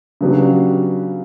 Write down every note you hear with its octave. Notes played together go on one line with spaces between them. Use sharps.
C#3 F#3 B3 D4 G4